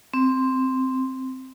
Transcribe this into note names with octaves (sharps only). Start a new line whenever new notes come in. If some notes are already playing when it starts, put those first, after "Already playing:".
C4